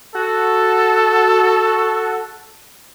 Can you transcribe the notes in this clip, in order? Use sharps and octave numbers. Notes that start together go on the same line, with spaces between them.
F#4 A4